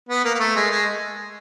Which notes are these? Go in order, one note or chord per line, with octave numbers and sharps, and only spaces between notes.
B3
A#3
A#3
A3
G#3
G#3